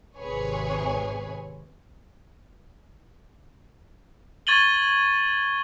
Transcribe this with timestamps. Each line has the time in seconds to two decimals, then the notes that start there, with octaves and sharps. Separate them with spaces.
0.16 G#1 C3 G#4 B4 C#5 G#5
4.47 C#6 G#6 A6 D#7 F#7 G7